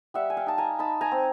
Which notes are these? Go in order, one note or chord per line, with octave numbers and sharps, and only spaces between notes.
G3 E5 F#5
G#5
F5 G5
D#4 A5
G#5 A#5
D#4 A5 B5
G#5 A#5
C4